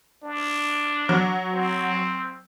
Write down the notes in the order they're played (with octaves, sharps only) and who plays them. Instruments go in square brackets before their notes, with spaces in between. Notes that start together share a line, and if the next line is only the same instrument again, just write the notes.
[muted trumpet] D4
[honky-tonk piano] F#3
[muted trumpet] C4